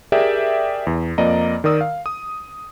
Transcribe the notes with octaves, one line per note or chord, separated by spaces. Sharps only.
G4 G#4 A#4 D5 E5 G5
E2
F2 A#3 D5 D#5 A#5
D#3 A#4 D5 D#6 E6
F5
D#6